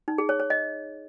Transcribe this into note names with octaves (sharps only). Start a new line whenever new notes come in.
D#4
G#4
C#5
C#5
D#5